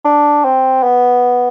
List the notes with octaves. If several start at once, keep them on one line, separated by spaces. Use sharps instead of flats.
D4
C4
B3